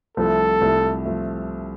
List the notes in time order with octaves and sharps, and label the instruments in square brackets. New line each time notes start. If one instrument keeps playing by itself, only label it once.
[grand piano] C2 C3 F3 A3 [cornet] A4
[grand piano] C2 C3 F3 A3
F3 A3